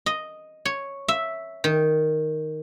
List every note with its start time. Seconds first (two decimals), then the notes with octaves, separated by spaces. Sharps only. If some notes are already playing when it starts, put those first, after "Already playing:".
0.06 D#5
0.65 C#5
1.08 E5
1.64 D#3